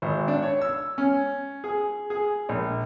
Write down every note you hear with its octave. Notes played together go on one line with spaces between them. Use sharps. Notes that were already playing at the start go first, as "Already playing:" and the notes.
G#1
D4
C#5
E6
C#4
G#4
G#4
A#1